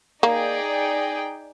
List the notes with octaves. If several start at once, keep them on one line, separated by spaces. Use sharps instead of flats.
A#3 D#4 G#4 D5 G5